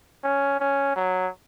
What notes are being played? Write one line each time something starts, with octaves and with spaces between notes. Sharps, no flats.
C#4
C#4
F#3